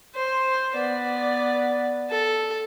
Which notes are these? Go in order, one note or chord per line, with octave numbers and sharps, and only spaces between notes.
C5
B3 D5
A4